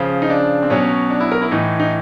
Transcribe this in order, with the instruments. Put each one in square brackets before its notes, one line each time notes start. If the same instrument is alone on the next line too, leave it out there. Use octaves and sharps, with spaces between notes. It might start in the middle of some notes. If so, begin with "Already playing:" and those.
Already playing: [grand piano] C#3 F3
D#4
D4
C4
B2 F#3 C#4
D4
E4
A#4
E4
A2 E3 D#4
D#4